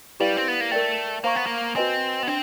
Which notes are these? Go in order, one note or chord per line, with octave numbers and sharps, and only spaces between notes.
G3 E4 G4 B4 D5 F5
C4
B3
A#3
A3 A#4 D5 G5
A#3 C5 F5 A#5 C#6
B3
A#3
C4 F#4 B4 D#5 G#5
B3
C4 D4